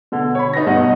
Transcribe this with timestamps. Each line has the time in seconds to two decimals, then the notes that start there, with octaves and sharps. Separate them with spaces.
0.12 B2 D3
0.35 C#5 B5
0.53 D#4 B4 A#6
0.67 G2 B2 D#4 D#5 F#5